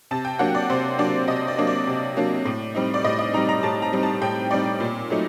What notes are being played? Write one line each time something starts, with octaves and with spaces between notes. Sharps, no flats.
C3 A5
G5
F#3 A#3 D4 F#5
D5
C3 C5
F#3 A#3 D4 D5
C3 D#5
D5
F#3 A#3 D4
D5
C3
F#3 A#3 D4
A2
G3 C4 D#4
D5
A2 D#5
D#5
G3 C4 D#4 A#5
A#5
A2 A5
A#5
G3 C4 D#4
A5
A2 G5
G3 C4 D#4 D5
A#2
F#3 A3 D#4